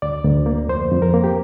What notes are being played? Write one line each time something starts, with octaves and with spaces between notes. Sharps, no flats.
D2 D5
D2
A#3
F2 C5
F2
A#4
A#3
G4